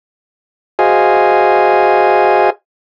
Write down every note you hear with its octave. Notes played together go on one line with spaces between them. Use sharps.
F#4 G#4 C5 D#5 F5 G#5